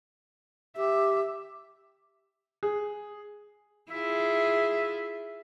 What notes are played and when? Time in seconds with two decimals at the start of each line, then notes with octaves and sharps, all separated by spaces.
0.77 G4 E5
2.63 G#4
3.91 E4 F4 G#4 E5